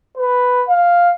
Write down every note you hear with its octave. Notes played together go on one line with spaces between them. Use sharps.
B4
F5